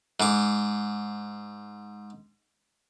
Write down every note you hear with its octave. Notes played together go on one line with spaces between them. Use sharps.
G#2 D6